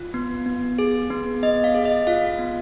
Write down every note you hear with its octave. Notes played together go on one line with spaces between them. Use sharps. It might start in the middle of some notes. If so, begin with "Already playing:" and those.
Already playing: F4
B3
B3
G#4
B3
B3 D#5
F5
G#4
D#5
F4 F5
B3